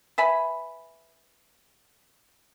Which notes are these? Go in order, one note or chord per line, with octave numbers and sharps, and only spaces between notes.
B4 E5 G#5 B5